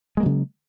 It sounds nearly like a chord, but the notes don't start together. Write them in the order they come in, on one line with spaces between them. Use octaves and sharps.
G#3 A#3 F#3 C#3